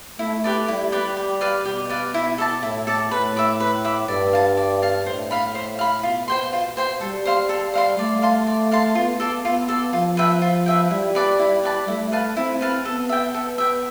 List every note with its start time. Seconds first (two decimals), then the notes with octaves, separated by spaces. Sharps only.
0.19 A3 E4
0.44 G4 B4 D5
0.68 G3 E4
0.92 G4 B4 D5
1.17 G4
1.41 B4 D5 F5
1.65 B2 G4
1.89 B4 D5 F5
2.14 E4
2.38 A4 D5 A5
2.63 A2 E4
2.87 A4 D5 A5
3.11 A2 B4
3.36 E5 B5 D6
3.60 B4
3.84 E5 B5 D6
4.08 G2 D5
4.33 F5 A5
4.57 D5
4.82 F5 A5
5.06 A2 C5
5.31 F5 B5
5.55 C5
5.79 F5 B5
6.03 B2 F4
6.28 C5 G5 C6
6.53 F4
6.77 C5 G5 C6
7.01 G3 A4
7.25 C5 F5 C6
7.49 A4
7.74 C5 F5 C6
7.98 A3 D5
8.22 F5 A5 C6
8.47 D5
8.71 F5 A5 C6
8.95 B3 F4
9.20 A4 D5
9.44 B3 F4
9.68 A4 D5
9.93 F3 F4
10.17 B4 E5 G5
10.42 F4
10.66 B4 E5 G5
10.90 G3 E4
11.15 B4 D5 A5
11.39 E4
11.63 B4 D5 A5
11.88 A3 E4
12.12 B4 F5 A5
12.36 C4 E4
12.61 B4 F5 A5
12.85 B3 A4
13.09 E5 G5
13.34 A4
13.58 E5 G5